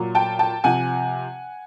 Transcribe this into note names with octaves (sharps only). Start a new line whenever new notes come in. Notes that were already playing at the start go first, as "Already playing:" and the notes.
Already playing: A#2 F#3
G5 A5
G5 A5
C3 F3 F#5 G#5